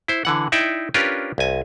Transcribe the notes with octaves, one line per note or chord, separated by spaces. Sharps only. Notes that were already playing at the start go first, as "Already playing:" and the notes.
E4 C5
D3 E3 F#5
D#4 E4 D5 E5 G5
C#4 D4 F4 G4 A#4 B4
C2 G#5